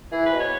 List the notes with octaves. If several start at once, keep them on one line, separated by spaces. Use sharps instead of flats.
E3 G#4
G#2 B4
B2
C#5